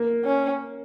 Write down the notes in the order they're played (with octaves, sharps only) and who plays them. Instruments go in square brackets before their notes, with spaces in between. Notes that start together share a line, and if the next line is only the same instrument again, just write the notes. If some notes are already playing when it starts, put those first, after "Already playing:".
Already playing: [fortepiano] A#3
[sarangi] C#4